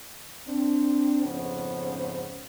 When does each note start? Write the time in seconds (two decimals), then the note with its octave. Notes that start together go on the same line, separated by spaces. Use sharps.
0.48 C4 D4
1.23 F2 G#2 C#3 B3 C#4 C5